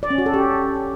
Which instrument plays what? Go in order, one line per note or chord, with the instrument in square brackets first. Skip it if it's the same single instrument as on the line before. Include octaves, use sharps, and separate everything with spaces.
[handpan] D5
C#4
F#4
A4
G4